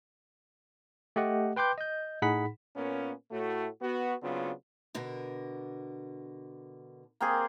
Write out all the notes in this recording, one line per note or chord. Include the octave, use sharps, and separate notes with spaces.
A3 G4 D#5 F#5
B4 G5 C6 D6 G6
D#5 G6
A2 D#4 G#4 F#5 B5 B6
A#2 A#3 B3 C#4
A2 A3 F#4
B3 F#4
C#3 F#3 B3 C4 D4 F4
B2 D3 A#4
A#3 C4 G#4